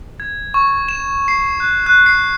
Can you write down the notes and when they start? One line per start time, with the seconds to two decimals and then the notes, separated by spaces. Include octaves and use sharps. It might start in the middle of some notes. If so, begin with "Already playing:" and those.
0.20 G#6
0.54 C#6
0.89 E7
1.28 C7
1.60 F#6
1.86 F#6
2.06 C7